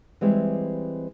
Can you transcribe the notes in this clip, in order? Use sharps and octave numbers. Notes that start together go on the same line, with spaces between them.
E3 G3 G#3 C4 G4 E5